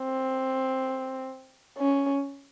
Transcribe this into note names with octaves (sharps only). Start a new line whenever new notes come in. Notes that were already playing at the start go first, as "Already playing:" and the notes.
Already playing: C4
C#4